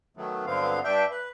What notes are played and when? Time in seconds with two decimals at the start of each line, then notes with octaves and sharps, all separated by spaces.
0.17 D#3 F#3 A3 B3
0.46 G2 D3 F#3 B3 C4 F5
0.84 G2 D4 E5 G5
1.11 B4